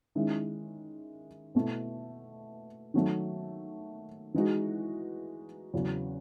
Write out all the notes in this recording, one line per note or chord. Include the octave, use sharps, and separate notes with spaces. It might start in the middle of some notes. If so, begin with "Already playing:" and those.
D#3 G#3 C#4 E4
B2 A3 E4
D#3 F#3 A3
E3 G#3 D#4 F#4
E2 C#3 F#3 C#4 F#4